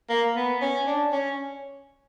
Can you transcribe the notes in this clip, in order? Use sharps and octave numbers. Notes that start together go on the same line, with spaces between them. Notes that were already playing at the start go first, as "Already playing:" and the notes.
A#3
B3
C#4
D4
C#4